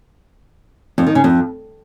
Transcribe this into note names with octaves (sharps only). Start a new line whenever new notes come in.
F2
D#3
C#3
F2